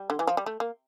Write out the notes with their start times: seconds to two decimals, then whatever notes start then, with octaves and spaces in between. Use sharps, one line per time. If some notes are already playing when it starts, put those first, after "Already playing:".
Already playing: G3
0.10 D3
0.19 E3
0.27 F3
0.37 G3
0.46 A3
0.60 A#3